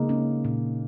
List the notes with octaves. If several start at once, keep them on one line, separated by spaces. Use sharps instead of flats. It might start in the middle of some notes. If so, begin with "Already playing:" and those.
Already playing: C#3 G#3 A#3 D#4
C#4
A#2